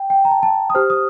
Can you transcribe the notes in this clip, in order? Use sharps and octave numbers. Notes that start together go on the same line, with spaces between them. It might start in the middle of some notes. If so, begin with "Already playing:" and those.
Already playing: G5
G5
A#5
A5
A5
D#6
G4 C5 F6
D#6